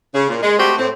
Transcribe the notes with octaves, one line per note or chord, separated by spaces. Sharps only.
C#3
A#2
G#3
A3 C4 F#4 G4
A2 C4